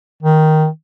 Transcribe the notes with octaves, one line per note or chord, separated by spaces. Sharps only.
D#3